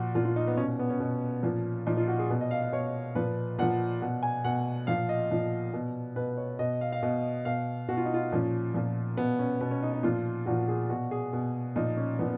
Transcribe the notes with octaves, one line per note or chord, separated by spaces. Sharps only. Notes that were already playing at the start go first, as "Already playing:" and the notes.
Already playing: A#2 F3 F#4
A#2 F3 F4
F4
D#4
B3
B2 C#4
C#4
B3
C#4
B2
A#2 F3
A#2 F3 D#4
F4
F#4
G#4
B2 B4
D#5
F5
F5
B2 C#5
A#2 F3 B4
A#2 F3 F#5
B2 F#5
G#5
B2 F#5
A#2 F3 F5
D#5
A#2 F3
B2
B2 B4
C#5
B2 D#5
F5
F5
B2 D#5
B2 F5
B2 F#4
F4
D#4
F4
A#2 F3 C#4
A#2 F3
B2 B3
C#4
B2 B3
C#4
D#4
D#4
A#2 F3 F4
A#2 F3 F#4
G#4
B2 F#4
G#4
B2
A#2 F3 D#4
C#4
A#2 F3 B3